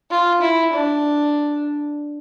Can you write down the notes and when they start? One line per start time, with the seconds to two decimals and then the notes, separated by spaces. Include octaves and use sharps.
0.11 F4
0.42 E4
0.73 D4